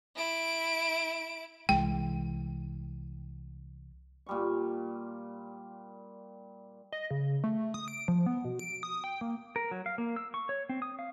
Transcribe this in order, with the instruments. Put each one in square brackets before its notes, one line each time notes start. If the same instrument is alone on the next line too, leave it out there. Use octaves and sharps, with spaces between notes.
[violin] E4 D7
[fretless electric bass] C2 E3 G#3 [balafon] G5
[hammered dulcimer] A#2 G3 C#6
[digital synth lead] D#5
C#3
A3
D#6
D7
F3
B3
B2
D7
D#6
G5
A#3
[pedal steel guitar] A#4
F#3
F5
A#3
E6
C#6
C#5
C4
D#6
F5